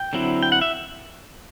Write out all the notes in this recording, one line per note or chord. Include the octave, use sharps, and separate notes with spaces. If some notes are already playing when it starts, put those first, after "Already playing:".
Already playing: G5
D3 F#3 C4 E4
G5
F#5
E5